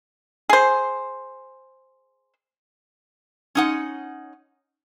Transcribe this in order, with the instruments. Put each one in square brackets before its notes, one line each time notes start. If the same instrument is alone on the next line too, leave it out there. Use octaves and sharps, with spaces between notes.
[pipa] G#4 C5
[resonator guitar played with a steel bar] C#4 D#4 F#5